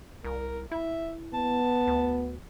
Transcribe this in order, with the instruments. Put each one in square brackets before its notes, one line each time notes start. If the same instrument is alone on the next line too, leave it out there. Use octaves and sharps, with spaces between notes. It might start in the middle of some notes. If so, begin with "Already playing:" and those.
[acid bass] C2 [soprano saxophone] A#4
[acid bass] E4 [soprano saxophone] E5
[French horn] B3 [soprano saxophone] A5
[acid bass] D2